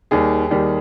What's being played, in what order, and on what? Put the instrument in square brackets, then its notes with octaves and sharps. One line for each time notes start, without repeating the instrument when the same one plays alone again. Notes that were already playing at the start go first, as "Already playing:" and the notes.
[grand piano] D#2 D#3 G3 G#4
D#2 D#3 G3